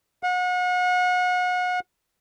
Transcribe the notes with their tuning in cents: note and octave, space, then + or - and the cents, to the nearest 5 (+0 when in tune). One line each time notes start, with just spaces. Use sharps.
F#5 -35